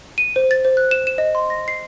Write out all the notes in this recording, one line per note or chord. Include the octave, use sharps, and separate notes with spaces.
D#7
C5
A6
C5
F#6
E7
E7
D#5
C6
A#6
C7